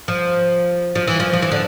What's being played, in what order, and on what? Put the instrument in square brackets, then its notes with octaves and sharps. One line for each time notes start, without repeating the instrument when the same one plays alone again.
[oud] F3
F3
E3
F3
F3
E3
D3